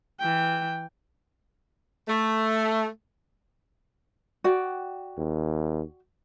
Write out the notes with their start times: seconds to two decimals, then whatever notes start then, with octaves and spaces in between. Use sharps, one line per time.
0.20 E3 G5
2.08 A3
4.44 F#4 D5 G5
5.17 D#2